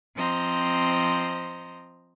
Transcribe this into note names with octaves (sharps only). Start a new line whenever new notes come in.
F3 C4 C5 D#5 A#5